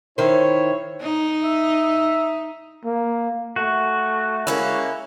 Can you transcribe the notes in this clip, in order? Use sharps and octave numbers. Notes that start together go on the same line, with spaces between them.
D#3 E4 C5 C#5
D#4
E5
A#3
A3 F#4
G#3 A#3 C#4 E4